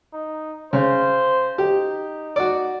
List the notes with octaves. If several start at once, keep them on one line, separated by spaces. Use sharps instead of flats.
D#4
C#3 C5
D#4 G4
F#4 D5